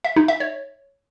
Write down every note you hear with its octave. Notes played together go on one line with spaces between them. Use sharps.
E5
D#4
E5
C#5